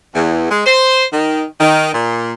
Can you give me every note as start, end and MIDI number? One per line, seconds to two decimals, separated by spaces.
0.15 0.46 40
0.51 0.62 56
0.66 1.03 72
1.12 1.44 51
1.60 1.92 51
1.94 2.32 46